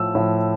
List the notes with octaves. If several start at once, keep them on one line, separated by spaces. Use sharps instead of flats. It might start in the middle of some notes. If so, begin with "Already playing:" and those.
Already playing: A2 F3 E6
A2 F3